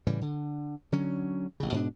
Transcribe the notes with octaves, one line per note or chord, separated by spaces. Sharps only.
A2 C#3 E3 G3
D3
D3 F#3 C#4
A1 C#3
G#2 B2 D4